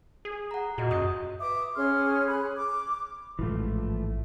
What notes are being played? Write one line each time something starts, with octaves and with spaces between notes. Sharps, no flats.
G#4
F#5 A#5
A#2 F#4 D#5
F#2 D#6 G6
B4 E5 D6 D#6
C#4 G#4 C6 F6
G#4 B5 F#6
D6
A1 G#2 E3 F3 A3